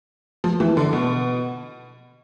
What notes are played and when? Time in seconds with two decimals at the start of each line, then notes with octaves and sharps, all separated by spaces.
0.44 F3
0.60 E3
0.77 D3
0.93 B2